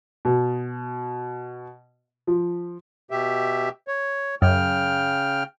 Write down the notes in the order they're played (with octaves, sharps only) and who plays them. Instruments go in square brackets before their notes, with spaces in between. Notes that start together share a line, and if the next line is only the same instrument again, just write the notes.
[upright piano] B2
F3
[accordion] B2 G4 E5
C#5
[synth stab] F#2 [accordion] C#3 G5 F6